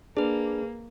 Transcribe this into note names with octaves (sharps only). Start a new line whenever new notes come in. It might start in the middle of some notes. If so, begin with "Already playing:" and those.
A#3 D4 G#4 B4